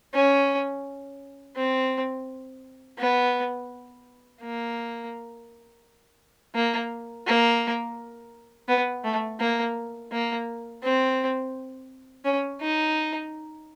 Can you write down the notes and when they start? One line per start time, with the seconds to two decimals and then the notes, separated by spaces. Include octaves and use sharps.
0.14 C#4
1.56 C4
2.98 B3
4.42 A#3
6.55 A#3
7.27 A#3
8.68 B3
9.04 A3
9.40 A#3
10.12 A#3
10.83 C4
12.25 C#4
12.61 D#4